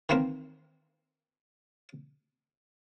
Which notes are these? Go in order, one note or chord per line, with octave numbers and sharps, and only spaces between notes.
D#3 E3 A#3 C4 A#4